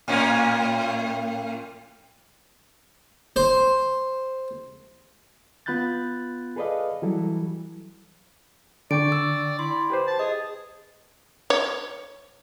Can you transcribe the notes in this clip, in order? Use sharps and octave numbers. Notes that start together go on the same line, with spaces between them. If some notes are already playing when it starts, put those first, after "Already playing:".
A2 A#3 C#4
C5
B3 F4 B5 F#6 G6 A6
G#4 A4 B4 D5 D#5 F5
E3 F#3 G3 E4 A4
D3 D5 G5 C#6 D7
E6
E4 C6
G4 B4 C5
A5
G#4 D#5
C#5